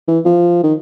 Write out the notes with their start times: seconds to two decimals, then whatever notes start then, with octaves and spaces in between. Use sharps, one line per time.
0.08 E3
0.25 F3
0.63 D#3